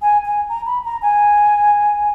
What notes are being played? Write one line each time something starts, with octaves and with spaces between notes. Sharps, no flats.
G#5
G#5
A#5
B5
A#5
G#5